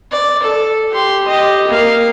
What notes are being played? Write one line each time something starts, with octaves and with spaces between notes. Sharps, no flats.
D5
A4
G4 C6
G4 D#5
A#3 F5